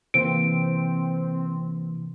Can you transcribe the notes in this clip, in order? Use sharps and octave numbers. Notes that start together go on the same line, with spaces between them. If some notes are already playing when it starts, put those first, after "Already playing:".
C3 E3 A#3 C4 D7